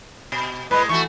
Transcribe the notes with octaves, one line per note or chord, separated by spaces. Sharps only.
B2
A2 G#3 B4
E3 A3 F#4 C#6